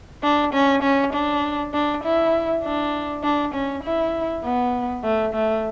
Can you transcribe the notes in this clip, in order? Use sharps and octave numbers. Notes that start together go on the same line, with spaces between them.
D4
C#4
C#4
D4
D4
E4
D4
D4
C#4
E4
B3
A3
A3